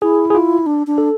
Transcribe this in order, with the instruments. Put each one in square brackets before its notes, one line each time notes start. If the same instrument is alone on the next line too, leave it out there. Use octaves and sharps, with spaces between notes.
[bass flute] E4 [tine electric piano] G#4
[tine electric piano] G#4
F4
[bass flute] D4
D4
[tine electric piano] A4